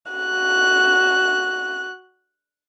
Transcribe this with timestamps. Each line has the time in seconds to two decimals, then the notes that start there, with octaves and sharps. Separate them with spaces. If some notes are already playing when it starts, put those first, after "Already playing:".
0.12 F#4 F#6